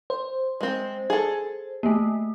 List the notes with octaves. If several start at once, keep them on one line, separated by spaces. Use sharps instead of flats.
C5
G#3 C4
G#4 A4
A3 A#3